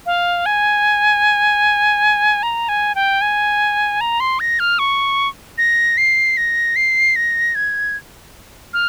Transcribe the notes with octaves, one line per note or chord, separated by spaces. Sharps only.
F5
G#5
A#5
G#5
G5
G#5
A#5
C6
A#6
F6
C#6
A#6
C7
A#6
C7
A#6
G#6
F6